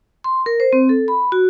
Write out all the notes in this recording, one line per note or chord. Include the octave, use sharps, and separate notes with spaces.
C6
A#4
C5
C4
A4
B5
F#4